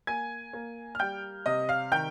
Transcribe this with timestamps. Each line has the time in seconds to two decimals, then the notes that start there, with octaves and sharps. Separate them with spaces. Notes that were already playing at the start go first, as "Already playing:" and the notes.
0.07 A#3 G#5 G#6
0.53 A#3
0.95 F6
1.00 G3 G5 G6
1.46 C3 D#5 D#6
1.69 F5 F6
1.92 D#3 G5 G6